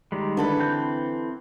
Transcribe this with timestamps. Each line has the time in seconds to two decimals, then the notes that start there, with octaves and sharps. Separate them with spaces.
0.12 D#3 G3 G#3
0.37 D3 E3 A4 B4
0.59 C4 G6